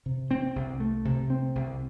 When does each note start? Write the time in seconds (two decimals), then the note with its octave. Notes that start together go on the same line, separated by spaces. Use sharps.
0.06 C3
0.31 C4
0.56 C2
0.80 A3
1.05 C3
1.30 C4
1.55 C2